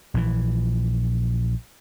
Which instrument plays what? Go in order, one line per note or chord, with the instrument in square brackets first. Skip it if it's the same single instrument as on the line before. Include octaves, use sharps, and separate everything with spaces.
[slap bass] A#1 E3